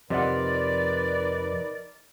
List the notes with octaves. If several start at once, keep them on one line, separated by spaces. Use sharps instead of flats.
F2 C3 D#4 A#4 B4 D5 D#5 F#5